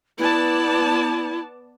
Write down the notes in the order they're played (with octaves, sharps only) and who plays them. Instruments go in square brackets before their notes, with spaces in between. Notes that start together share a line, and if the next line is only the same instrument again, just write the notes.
[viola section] B3 D5 A5 [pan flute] E4